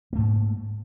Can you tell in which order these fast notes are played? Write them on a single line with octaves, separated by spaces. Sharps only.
A#3 A3 G#2